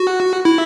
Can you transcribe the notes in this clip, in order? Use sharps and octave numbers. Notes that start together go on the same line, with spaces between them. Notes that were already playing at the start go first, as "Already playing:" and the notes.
Already playing: F#4
E4